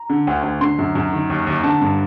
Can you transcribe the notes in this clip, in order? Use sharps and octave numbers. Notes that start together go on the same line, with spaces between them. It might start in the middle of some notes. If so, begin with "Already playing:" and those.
Already playing: A#5
D3
D2
D2
D3 C6
F#2
F#2
D#3
D#2
D#2
D3 A5
G2